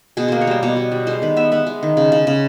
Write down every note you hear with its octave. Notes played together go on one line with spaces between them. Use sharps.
B2 G#4
A#3 C5
C#5
G3 C5
B2 C#5
G3
G3
G#3 C5
D#3 B4
B3 E5
B3 E5
G#3
D#3
C#3
C#3
C#3